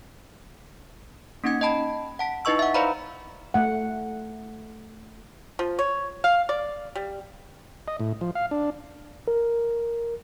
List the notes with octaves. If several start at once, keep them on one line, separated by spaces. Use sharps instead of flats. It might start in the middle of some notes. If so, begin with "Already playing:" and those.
A#3 C#4 D#4 F#5 G#6 C#7
D#5 G5 A5 B5
F#5 A5 B6
D#4 E4 B4 D#5 C#6 E6
E5 F#5
B4 C5 D5 F5 A#5 B5
A3 F#5
F3
C#5
F5
D5
G3
D#5
A2
F3
F5
D4
A#4